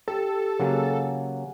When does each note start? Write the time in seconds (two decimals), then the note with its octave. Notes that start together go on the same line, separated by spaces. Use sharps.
0.08 G4 A4
0.60 C#3 F#3 A#3 G#4 F5 F#5